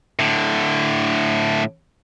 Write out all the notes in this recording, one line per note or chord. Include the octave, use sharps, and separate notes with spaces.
A2 D3